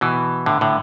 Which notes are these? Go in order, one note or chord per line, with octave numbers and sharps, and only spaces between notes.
B2 E3
A2 D3
A2 D3